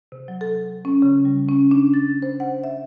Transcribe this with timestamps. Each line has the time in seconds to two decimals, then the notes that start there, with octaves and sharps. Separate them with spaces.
0.12 C3
0.28 F#3
0.41 A4
0.85 C#4
1.02 C#3
1.25 G3
1.49 C#4
1.71 D4
1.94 A6
2.22 C5
2.40 F#5
2.64 E5